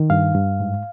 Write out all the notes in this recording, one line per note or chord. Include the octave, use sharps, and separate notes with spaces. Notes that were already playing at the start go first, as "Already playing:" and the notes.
Already playing: D#3
G2 F5
G2
G#2